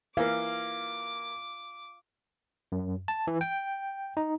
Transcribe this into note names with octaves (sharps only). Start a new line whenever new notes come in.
E3 A#3 F5 D6
F#2
A5
E3
G5
D#4